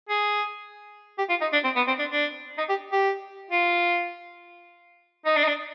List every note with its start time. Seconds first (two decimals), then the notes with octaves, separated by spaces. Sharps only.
0.09 G#4
1.18 G4
1.29 F4
1.41 D#4
1.53 D4
1.64 C4
1.76 B3
1.88 C4
1.99 D4
2.11 D4
2.58 D#4
2.69 G4
2.92 G4
3.51 F4
5.26 D#4
5.37 D4
5.44 D#4
5.48 D4